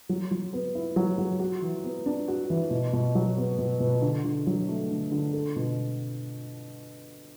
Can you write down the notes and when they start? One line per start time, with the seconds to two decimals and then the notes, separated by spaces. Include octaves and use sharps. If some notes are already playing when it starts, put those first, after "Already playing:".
0.09 F#3
0.31 F#3
0.53 B3
0.75 E4
0.96 F#3
1.18 F#3
1.39 F#4
1.62 E3
1.84 B3
2.06 D4
2.28 F#4
2.50 E3
2.71 B2
2.93 B2
3.15 F#3
3.37 B3
3.59 B2
3.80 B2
4.02 D3
4.25 D3
4.47 F#3
4.68 A3
4.90 D3
5.12 D3
5.33 A4
5.56 B2